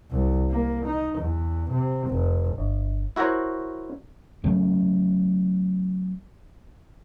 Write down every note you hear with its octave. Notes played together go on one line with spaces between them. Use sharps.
C2
A#3
D#4
E2
C3
F1
G1
E4 F#4 A#4 C5 C#5
C#3 F#3 A3 C#4